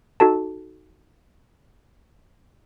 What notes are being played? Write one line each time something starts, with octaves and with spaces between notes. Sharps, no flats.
D#4 F#4 A4 A5